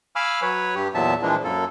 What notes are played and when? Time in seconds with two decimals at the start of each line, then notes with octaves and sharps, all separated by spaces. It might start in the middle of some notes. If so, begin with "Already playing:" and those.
0.16 F5 G#5 B5 D6 E6 F6
0.42 F#3 B4 C#5
0.75 G2 G4
0.94 E2 A#2 F#3 B3 E5 A5
1.22 A#2 E3 F3 G#3 A#3 D4
1.44 F#2 A#3 A4